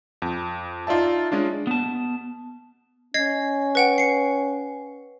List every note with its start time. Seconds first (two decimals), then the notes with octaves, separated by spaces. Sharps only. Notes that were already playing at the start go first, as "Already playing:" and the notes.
0.22 F2
0.87 D#4 F4 D5 E5 A5
1.31 G#3 C#4 D4 F4
1.67 B3 A5
3.14 C#4 D#5 G#6 C7
3.75 B4 F#5 G5
3.98 C7 C#7